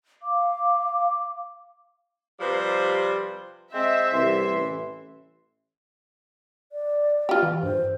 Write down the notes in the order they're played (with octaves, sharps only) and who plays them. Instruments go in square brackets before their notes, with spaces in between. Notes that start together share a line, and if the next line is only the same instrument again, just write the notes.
[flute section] F5 D6
[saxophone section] C3 F3 G3 B4 C5
[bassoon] G#3 [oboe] C4 [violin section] E5
[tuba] C2 [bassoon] E3 [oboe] C6
[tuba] A1
[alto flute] D5
[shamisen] F4 G4
[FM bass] E3
[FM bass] G2 [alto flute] C5